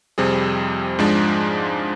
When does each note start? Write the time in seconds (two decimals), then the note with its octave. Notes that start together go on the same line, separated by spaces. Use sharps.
0.18 F2 C3 G3 C4 G#4
0.99 G#2 F3 G#3 D4